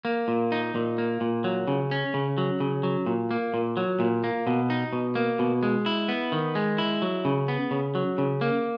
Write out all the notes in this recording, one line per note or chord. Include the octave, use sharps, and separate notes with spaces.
A#3
A#2
D#4
A#2
A#3
A#2
F#3
C#3
C#4
C#3
F#3
C#3
F#3
A#2
A#3
A#2
F#3
A#2
A#3
B2
D#4
B2
A#3
B2
G#3
E4
B3
D#3
G#3
E4
F#3
C#3
B3
C#3
F#3
C#3
A#3